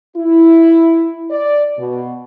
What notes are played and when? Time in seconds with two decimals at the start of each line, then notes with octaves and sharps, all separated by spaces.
0.16 E4
1.31 D5
1.78 B2